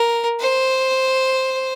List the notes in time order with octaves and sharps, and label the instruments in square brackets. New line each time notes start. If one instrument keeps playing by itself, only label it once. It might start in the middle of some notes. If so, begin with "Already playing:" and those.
Already playing: [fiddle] A#4
C5